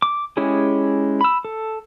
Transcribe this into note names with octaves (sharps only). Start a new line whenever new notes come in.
D6
G#3 C#4 E4 G4 G#4
B5 E6
A4